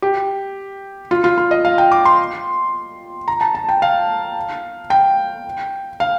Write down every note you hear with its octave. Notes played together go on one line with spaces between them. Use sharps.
G4
F4
F4
F4
D#5
F5
G5
D6
C6
A#5
A5
A5
G5
F5
G5
F5